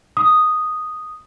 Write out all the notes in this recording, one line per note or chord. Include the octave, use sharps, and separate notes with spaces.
D#6